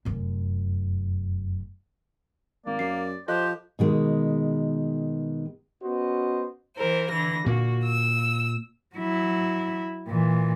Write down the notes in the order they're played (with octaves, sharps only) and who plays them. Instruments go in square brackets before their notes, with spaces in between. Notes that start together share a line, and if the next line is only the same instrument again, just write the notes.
[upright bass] F1 F#2
[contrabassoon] G#1 [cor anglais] A#3 [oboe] D5
[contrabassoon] F#2 [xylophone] C7
[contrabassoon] F3 [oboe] G4 [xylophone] A4 D#5 F#6 [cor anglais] C5
[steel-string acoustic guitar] B2 D#3 G#3
[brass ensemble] B3 C#4 F#4 C5 D#5
[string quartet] E3 A#4 C5
D3 E3 A#6
[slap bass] A#2 A#3 [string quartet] F#4
[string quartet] E6
[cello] F#3 E4
A#2 E3